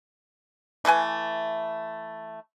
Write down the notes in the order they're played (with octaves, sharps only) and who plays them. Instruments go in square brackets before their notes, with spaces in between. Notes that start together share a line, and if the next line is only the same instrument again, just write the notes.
[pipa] E3 A3 B4 G#5